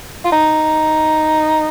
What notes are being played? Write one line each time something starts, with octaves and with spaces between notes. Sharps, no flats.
F4
D#4